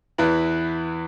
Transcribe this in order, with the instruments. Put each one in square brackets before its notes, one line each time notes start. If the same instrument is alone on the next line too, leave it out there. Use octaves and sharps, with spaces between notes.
[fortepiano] E2 E3 B4